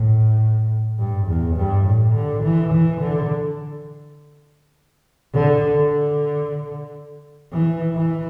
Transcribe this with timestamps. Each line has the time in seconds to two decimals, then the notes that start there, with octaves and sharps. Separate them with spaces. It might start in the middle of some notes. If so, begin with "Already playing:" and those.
Already playing: A2
0.98 G2
1.27 E2
1.56 G2
1.85 A2
2.14 D3
2.43 E3
2.73 E3
3.02 D3
5.34 D3
5.77 D3
7.52 E3
7.95 E3